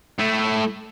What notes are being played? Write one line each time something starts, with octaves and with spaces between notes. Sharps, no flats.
A3 E4